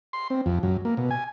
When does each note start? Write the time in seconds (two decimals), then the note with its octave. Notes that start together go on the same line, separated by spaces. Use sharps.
0.13 C6
0.30 C4
0.46 F2
0.63 F#2
0.85 A#3
0.97 B2
1.11 G#5